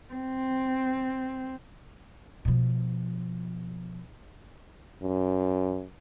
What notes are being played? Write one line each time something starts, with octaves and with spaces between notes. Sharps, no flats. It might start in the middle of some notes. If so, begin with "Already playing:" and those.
C4
B2 F3
F#2